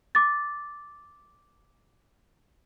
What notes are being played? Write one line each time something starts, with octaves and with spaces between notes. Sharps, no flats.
D6 A6